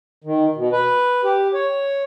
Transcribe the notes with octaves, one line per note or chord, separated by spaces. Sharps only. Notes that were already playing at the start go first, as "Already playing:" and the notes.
D#3
B2
B4
G4
C#5